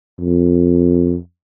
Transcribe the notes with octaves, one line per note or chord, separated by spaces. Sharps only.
F2